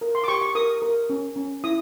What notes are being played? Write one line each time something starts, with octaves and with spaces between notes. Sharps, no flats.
A#4
C6
D6
G4 C#6
C#6
A#4 D#6
A#4
C#4
C#4
E4 D#6